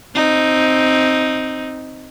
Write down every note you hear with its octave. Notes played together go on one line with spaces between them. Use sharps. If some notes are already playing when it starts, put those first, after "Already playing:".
C4 D#4